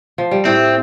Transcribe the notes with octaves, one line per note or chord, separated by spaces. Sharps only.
F3
G3
A2 A3 C4